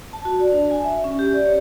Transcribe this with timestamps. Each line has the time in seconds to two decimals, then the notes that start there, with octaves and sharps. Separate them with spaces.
0.13 A5
0.25 F#4
0.39 D5
0.52 D4
0.71 G#5
0.84 E5
1.04 C#4
1.19 G4
1.33 D5
1.45 C#5